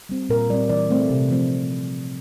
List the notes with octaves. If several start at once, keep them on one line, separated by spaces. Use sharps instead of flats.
G3 C4
A#2 A#4
G3 C4 D5
E3 D5
A3 C4
C3
F3 A3 C4